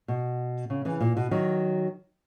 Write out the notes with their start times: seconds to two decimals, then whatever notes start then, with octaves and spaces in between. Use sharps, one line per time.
0.08 B2
0.70 C#3
0.85 C#3 E3
1.01 A#2
1.17 B2
1.31 D#3 F#3